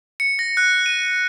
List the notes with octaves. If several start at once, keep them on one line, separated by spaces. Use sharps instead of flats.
C#7
A#6
F#6
D#7